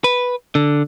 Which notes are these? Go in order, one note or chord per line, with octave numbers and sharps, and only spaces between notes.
B4
D3